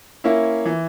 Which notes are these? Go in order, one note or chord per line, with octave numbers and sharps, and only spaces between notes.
A#3 C#4 E4
E3